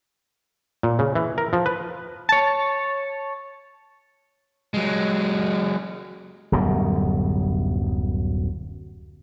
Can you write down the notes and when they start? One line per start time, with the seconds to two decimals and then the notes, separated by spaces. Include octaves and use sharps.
0.83 A#2
0.99 C#3
1.15 E3
1.38 A#4
1.53 F3
1.66 B4
2.29 C#5 A5
4.74 F#3 G#3
6.52 D1 F#2 B2 G3